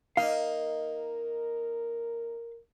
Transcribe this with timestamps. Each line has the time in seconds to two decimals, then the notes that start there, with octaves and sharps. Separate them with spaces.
0.17 A#3 D#4 A#4 F5